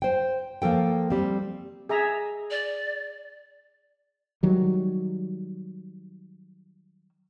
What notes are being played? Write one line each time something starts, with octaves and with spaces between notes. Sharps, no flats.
C5 G5
F3 A#3 A4 G5
G3 C4
G#4 E5 A#5
D5
D#3 F#3 G3